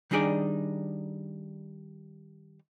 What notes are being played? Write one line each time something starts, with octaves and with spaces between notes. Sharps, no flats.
D#3 G3 D4 D#4 G#4 D5